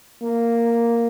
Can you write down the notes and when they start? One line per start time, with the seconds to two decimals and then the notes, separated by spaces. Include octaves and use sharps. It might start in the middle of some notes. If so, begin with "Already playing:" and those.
0.22 A#3